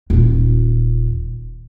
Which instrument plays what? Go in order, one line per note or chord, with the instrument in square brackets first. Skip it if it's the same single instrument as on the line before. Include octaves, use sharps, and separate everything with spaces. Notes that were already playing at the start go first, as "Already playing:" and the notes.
[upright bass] D#1 F4